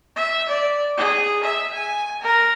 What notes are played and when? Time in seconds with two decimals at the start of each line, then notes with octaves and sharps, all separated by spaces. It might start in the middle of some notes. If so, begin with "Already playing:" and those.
0.16 E5
0.49 D5
0.98 G#4
1.44 E5
1.74 G#5
2.22 A#4